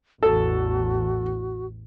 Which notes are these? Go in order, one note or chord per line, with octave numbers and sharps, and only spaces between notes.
A1 E2 F#4 A4